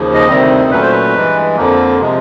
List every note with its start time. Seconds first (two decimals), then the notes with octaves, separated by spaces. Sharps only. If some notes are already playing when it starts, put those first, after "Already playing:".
Already playing: D#2 C#3 F3 A#3
0.14 D#5
0.28 D2 C3 D#3 G3 C4
0.71 A#2 F#3 A3 C#4 B4
0.81 C5
0.92 B4
1.14 G2 E3 G#3
1.57 F2 D3 F3 A#3
2.00 C3 F3 G#3